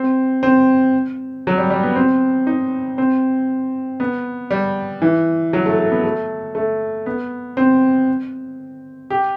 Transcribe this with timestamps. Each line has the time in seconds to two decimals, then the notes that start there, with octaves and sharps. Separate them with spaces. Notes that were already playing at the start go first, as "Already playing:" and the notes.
Already playing: C4
0.43 C4
1.47 F#3
1.58 G3
1.70 G3
1.83 B3
1.96 C4
2.47 D#4
2.98 C4
4.00 B3
4.51 G3
5.02 E3
5.53 F#3
5.66 A3
5.78 A3
5.91 B3
6.04 A3
6.55 A3
7.06 B3
7.57 C4
9.10 G4